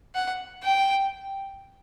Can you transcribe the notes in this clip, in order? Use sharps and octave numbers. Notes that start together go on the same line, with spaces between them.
F#5
G5